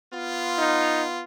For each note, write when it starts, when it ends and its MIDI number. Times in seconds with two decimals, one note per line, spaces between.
0.14 1.24 59
0.14 1.24 65
0.58 1.05 63